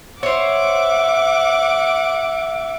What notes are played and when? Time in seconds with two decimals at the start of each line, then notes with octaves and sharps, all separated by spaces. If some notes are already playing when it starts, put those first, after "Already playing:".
0.23 C5 C#5 E5 F#5 D6